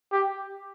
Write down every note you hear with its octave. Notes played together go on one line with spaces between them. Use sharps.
G4